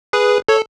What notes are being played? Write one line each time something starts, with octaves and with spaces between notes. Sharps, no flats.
G#4 B4
A4 C#5